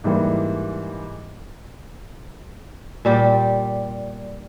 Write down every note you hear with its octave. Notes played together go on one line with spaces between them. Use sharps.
G#2 E3 G3 A#3
A#2 G3 G4